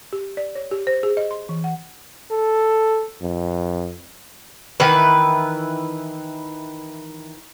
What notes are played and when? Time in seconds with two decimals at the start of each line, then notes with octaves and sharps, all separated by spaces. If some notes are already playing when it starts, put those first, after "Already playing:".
0.13 G4
0.37 D5
0.55 C#5
0.71 G4
0.87 C5
1.03 G#4
1.17 D#5
1.31 C6
1.49 E3
1.64 F#5
2.31 A4
3.22 F2
4.80 D#3 E3 B4